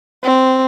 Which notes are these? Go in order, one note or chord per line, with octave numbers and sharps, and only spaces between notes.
C4